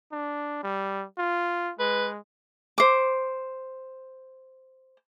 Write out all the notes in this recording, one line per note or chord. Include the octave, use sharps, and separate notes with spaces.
D4
G3
F4
G#3 B4
C5 D6